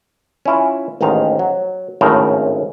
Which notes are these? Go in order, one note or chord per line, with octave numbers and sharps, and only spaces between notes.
C#4 E4 F4
A1 D#2 G#2 D#3 D#4 F5
F#3
G#1 A2 C#3 A3 A#4 C5